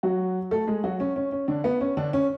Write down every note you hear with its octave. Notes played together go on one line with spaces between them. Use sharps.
F#3 F#4
A3 A4
G#3 G#4
F#3 F#4
C#4
C#4
C#4
D3 D4
B3
C#4
D3 D4
C#4